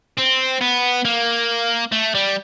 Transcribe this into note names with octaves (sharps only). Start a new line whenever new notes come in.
C4
B3
A#3
A3
G3